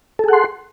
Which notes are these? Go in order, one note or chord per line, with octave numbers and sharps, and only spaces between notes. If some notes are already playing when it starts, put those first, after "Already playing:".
G#4 A4 F#5 C6